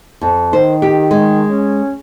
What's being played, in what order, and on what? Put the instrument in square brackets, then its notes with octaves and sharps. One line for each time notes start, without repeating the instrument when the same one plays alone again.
[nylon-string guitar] F2
[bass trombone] D#3 [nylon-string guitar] C5
[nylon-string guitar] G4
G#3
[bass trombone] C#4